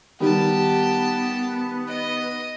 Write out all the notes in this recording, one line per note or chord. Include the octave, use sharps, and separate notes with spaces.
D#3 G3 B3 G4 A5
D#5